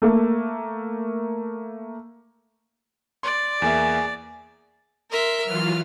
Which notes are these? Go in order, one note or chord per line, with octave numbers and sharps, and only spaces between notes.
A3 A#3
D5 C6
E2 A#3 G#4 E5
A#4 E5 C6
E3 F#3 F4 F6